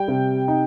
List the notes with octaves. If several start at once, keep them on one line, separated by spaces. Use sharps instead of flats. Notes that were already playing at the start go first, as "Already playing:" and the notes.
Already playing: G3 G5
C3
D#4